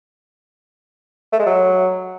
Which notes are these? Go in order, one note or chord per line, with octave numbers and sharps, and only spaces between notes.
A3
G#3
F#3